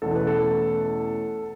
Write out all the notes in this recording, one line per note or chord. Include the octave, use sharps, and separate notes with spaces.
E2 B2 A3 C#4 A4
B4
A4